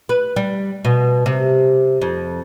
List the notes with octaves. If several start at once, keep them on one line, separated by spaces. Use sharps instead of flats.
B4
G3
B2
C3
F2